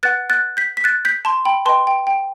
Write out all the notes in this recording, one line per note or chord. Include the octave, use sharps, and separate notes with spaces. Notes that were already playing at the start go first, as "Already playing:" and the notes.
B4 F#5 F#6 A6
F#6 A6
G6 B6
B6
F#6 A6
G6 B6
A5 C6
G5 B5
B4 D#5 G5 A5 C6
G5
G5